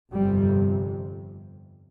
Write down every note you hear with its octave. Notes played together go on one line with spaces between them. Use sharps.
G1 F2 C3 G3